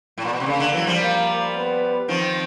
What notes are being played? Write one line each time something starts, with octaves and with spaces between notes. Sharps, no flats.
A2
A#2
B2
C3
C#3 A#3
D3
E3 F#3
F3 G3
A#3
B3
D#3 F3 C4